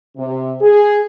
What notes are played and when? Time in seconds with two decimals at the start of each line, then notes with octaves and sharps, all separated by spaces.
0.17 C3
0.61 G#4